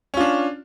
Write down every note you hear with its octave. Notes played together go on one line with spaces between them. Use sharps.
C#4 D4 F4